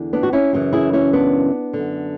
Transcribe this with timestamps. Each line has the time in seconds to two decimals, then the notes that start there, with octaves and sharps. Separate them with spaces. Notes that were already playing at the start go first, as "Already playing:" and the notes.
Already playing: E2 D3
0.13 B3 D4
0.23 F#4
0.33 C#4 E4
0.53 F#2 C#3 E3
0.73 E4 G#4
0.93 C#4 E4
1.13 B3 D4
1.73 F#2 D3